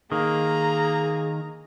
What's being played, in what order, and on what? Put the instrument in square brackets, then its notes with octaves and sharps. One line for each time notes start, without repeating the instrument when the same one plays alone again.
[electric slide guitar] D#3 [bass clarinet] A#3 [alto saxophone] G#4 [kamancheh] A#5